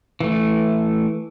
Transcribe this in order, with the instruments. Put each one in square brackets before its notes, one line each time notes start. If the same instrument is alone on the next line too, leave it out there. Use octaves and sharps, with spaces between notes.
[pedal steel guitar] E3 A3